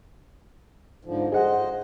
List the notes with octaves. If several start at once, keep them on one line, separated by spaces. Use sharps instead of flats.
G#2 D3 F3
G#4 C5 D#5 F#5